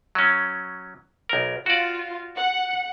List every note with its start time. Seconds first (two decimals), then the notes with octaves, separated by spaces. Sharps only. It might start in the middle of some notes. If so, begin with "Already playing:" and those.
0.15 F#3 C#4
1.29 B1 A#4
1.66 F4 F#4 D5
2.35 F#5